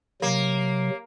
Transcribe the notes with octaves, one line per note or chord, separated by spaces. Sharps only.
C3 F#3 A#3